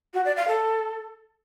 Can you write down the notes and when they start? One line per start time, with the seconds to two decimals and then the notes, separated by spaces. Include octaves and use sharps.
0.14 F#4
0.25 D5
0.36 F5
0.48 A4